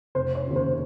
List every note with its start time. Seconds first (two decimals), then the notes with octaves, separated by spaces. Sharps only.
0.15 F1 C5
0.35 C#5
0.46 D#2 C#3
0.56 C5